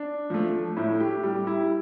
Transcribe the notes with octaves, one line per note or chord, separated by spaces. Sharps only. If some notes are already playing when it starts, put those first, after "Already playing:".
Already playing: D4
F3 A3
A2 E4
G4
G3 G4
E4